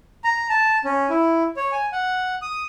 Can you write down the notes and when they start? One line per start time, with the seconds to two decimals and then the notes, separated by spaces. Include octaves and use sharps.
0.24 A#5
0.49 A5
0.85 C#4
1.10 E4
1.57 C#5
1.72 G#5
1.93 F#5
2.42 D#6